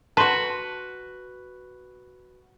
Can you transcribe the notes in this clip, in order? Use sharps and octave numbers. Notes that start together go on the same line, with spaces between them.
F#4 B4 A5 C6